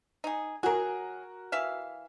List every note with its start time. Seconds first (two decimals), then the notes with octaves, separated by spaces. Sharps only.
0.24 D#4 G#4
0.63 F#3 F#4 G#4 A#4
1.52 E3 E5 F5